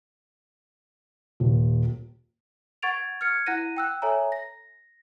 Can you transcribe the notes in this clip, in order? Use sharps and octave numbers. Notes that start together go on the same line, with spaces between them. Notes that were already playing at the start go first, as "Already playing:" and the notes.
D#1
F#5 C#6 G#6 A6 D7 F7
F6 G#6 C#7
E4 F#5 F#6 A#6 D#7
G5 E6 F#6
A4 C#5 E5 G#5 A#5
A#6